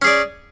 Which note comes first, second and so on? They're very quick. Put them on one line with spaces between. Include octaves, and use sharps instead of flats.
C#4 G#4 D5